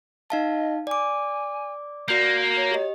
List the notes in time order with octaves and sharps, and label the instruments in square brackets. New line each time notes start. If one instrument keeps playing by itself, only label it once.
[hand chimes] D#4 F5 A5 [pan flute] D#5
[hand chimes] D5 D6 [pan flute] G#5
[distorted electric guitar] A#3 [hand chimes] F#4 G6 [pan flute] D5
[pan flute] C#5
[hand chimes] G4 D#5